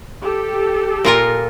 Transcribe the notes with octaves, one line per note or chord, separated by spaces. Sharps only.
G4 A4
A#2 F4 A#4